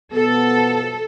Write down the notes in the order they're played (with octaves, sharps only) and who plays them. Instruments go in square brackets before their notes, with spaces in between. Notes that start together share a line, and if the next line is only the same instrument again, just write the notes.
[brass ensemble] B2 F3 B3 [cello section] A4